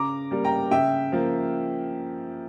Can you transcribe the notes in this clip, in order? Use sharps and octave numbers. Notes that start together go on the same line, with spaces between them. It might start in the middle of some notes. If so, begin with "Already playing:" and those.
Already playing: C#3 A#5 D6
G3 A#3
G5 A#5
C#3 E5 G5
F3 A#3